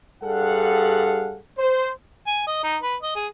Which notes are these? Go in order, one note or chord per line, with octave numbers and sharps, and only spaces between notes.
G2 G3 G#4 A4 F5 F#5
C5
G#5
D#5
D#4
B4
D#5
G#4